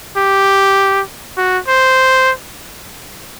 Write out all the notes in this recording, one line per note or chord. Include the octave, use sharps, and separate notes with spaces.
G4
F#4
C5